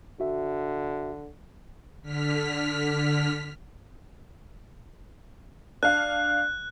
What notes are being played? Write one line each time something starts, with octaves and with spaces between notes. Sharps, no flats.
D3 F#4 E5
D3 F6 B6
D4 F5 F#6